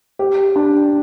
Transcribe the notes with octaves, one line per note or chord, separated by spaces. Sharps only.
G4
D4